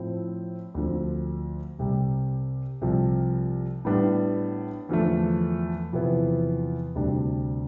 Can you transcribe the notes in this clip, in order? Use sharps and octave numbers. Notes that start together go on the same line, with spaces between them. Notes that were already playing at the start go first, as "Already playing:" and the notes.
Already playing: A2 F3 C4
D2 D3 F3 C4
C2 C3 G3
C2 C3 F3
A2 G3 B3 D4
E2 D3 F3 A3
E2 C3 F3 B3 E4
D2 C3 G3 D4